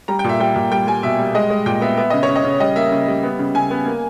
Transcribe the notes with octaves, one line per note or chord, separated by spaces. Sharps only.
G3 A#5
G5
A#2 E5
G3 G5
A#2
G3 G5
G3 G#5
B2 E5
G3
G#3 D#5
G#3
A#2 G5
B3 E5
B3 E5
C#3 D#5
C#5
C#3
D#5
C#3
G3 D#5
A#3 E5
C#3
G3
B3
C#3
C#3 G#5
B3
A#3